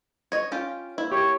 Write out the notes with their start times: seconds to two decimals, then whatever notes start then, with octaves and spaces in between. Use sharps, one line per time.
0.32 C#5 D#5
0.52 C#4 F4 G4
0.98 A#3 E4
1.12 G4 C#5